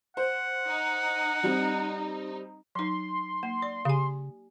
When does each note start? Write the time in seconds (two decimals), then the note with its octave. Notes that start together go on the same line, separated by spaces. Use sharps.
0.17 C5 F#5
0.66 D#4
1.43 G3 C4
2.75 F#3 D#4 C6
3.43 A#3
3.62 D5
3.85 C#3 G4 G#5